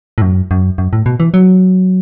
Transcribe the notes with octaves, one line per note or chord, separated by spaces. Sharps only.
A2
F#2
F#2
F#2
A2
B2
E3
F#3